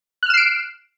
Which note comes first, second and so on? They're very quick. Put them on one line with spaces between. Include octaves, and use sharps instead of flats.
F#6 F6 E7 C7 D7